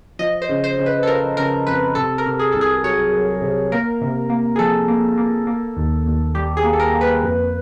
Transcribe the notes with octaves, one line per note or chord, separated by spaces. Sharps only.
F3 D#5
C5
C#3
C5
C#3
B4
A4
F3 A#4
C#3 A#4
F2 B4
C3 A4
A#4
C3
G#4
C2 A4
G#4
F#3 C#5
F#3
C3
A#3 A#4
C3
A#3
G#4
F3 A4
A#3
A#3
A#3
D#2
D#2
G3 G4
G#4
A#3
A4
A#4
A#3
B4
F2